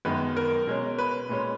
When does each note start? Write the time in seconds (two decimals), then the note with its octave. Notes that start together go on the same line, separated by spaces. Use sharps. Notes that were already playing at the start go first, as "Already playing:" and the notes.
0.05 F#2 D#3 G#3 B3 B4
0.37 A#4
0.67 B2 G#3 C#4
0.98 B4
1.29 A#2 G#3 C#4